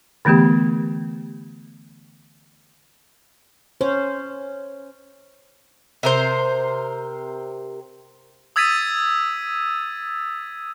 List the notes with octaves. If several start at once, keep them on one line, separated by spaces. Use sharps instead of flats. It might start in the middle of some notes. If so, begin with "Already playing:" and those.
D3 E3 A3 B3 G4
C#4 C5
C3 A#4 C5
D#6 E6 G#6 A6 B6 D#7